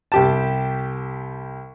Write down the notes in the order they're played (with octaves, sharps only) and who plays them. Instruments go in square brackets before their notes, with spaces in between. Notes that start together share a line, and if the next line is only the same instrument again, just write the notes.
[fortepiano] C2 G4 A5